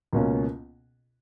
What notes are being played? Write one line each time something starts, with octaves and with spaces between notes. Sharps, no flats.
C#2 B2 A#3 C#4